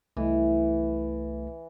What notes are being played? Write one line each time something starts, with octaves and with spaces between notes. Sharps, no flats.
C2 E3 A3